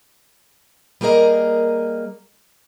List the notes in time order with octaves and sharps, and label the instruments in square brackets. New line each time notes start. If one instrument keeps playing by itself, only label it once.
[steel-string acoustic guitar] G3 A#3 G#4 A#4 D#5